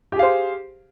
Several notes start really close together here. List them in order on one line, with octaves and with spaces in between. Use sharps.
G4 G#4 F5 C5